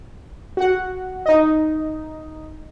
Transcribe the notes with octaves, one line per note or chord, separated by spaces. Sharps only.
F#4 F#5
D#4 D#5